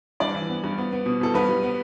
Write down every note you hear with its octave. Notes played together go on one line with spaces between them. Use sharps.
G2 D4 D5
E3
B3
G2
B3
B3
B2
B2 A4
G2 B3 B4
G3
B3